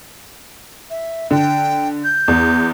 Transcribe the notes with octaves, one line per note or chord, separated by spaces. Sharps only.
E5
D3 G5
G6
E2